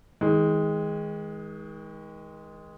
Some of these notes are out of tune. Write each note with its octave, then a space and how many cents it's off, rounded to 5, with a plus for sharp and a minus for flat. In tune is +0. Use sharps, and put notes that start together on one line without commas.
D#3 +40 G#3 +0